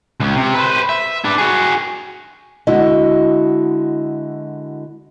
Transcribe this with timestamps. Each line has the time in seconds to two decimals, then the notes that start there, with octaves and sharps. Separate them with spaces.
0.20 C#2
0.36 C3
0.54 B4 C5
0.89 E5
1.25 D4 B4
1.38 F#4 G#4
2.67 D3 G#3 E4 F#4 D#5